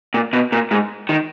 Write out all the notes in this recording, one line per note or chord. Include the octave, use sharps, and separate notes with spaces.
A#2
B2
A#2
G#2
D#3